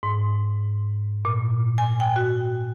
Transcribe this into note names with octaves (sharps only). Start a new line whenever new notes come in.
G#2
A#2
G#5
G5
F#4